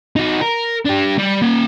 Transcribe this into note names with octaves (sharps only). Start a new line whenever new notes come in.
D#4 F#4
A#4
D4 G4
G3
A#3 F#5